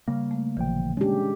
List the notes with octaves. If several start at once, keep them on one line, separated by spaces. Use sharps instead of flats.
C#3 G3 A#3
A3
A1 A#2 D3 E3 F3 G5
G#3 C#4 D4 G4